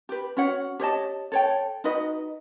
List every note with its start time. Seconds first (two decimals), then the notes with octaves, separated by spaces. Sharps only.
0.09 G4 B4
0.37 C#4 F#4 C#5 F#5
0.80 G4 C#5 D#5 A5
1.32 A4 C#5 G5
1.84 D#4 F#4 B4 D#5